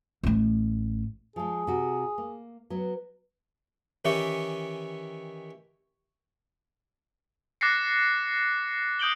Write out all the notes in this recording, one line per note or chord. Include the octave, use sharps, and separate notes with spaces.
A1 A3
F3 G#3 G#4
C3 F#4
A#3
F#3 B3
D#3 E3 C#4 G4 E5 C#6
D6 F#6 A6 A#6 C7 C#7
D#6 G6 D7 F#7 G7